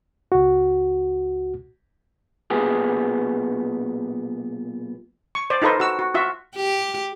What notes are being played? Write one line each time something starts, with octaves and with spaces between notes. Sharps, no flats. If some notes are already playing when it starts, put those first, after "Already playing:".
C#2 F#4
B1 A#2 B3 G4 G#4
C#6
C5 D5
D#4 F4 A4 B4 C5
F#4 E6
F#4
F4 F#4 E5
G4